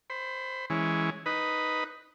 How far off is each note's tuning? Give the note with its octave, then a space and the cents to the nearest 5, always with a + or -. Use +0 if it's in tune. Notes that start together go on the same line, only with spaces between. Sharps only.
C5 +0 B5 +20
E3 -5 G#3 +0 C#4 +0
D#4 +0 B4 +0